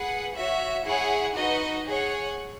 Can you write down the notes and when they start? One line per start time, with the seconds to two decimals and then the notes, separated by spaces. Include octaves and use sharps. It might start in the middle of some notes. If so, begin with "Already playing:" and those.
Already playing: G#4 B4 F#5
0.36 F#4 C#5 E5
0.86 E4 G#4 C#5 F#5
1.36 D#4 F#4 B4 D#5
1.87 G#4 C#5 F#5